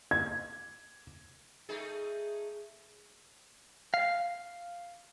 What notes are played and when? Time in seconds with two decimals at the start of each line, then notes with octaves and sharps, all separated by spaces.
0.11 G#6
1.69 A3 D#4 G#4
3.94 F5